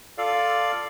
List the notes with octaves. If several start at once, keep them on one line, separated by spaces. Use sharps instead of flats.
F4 A4 D5 F5